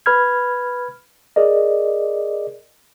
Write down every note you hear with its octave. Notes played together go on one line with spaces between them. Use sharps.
B4 B5 F6 G#6
G#4 A#4 D5 D#5